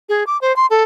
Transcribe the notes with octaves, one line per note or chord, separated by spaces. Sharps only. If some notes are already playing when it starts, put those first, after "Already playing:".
G#4
D6
C5
C6
A4